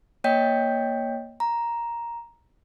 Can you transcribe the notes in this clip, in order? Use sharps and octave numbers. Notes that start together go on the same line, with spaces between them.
A#3 C#5 D#5 G5 G6 B6
A#5